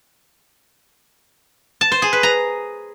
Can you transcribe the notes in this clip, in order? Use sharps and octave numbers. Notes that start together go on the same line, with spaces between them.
A5
C5
G#4
B4
A#5